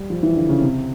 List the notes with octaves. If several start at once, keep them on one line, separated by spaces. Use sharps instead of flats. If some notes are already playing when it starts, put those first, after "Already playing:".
Already playing: G3
F3
E3
D3
C#3
C3